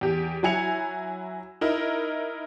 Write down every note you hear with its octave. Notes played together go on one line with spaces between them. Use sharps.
E2 G4
F#3 E4 G#5 C#7 F7
D#4 E4 A#4